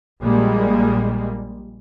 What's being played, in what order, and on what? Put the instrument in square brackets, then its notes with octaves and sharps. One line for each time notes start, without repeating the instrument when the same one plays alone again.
[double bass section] A#1 G3 G#3 A#3